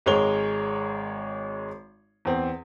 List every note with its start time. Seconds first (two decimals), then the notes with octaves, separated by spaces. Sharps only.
0.06 G#1 G#3 A#4 C#5 F7 G7
2.25 E2 C4